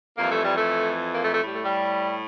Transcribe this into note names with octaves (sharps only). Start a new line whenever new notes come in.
F2 E3 G3 A#3
A3
G3
A3
A#3
A3
A3
A2 G3
A3
G3